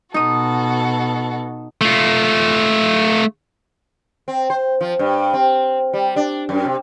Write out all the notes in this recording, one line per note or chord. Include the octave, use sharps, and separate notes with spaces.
B2 D#4 F#4 A4 D#6
A3 F4
C4
C5
F3
G2
C4
G3
D4
F#2
C3